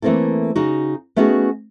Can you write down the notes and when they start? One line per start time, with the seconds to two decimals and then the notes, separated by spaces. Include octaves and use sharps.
0.02 E3 A3 A#3 C4 E4 A4
0.56 C#3 D#4 F#4
1.16 A3 B3 C#4 D#4 F#4 G#4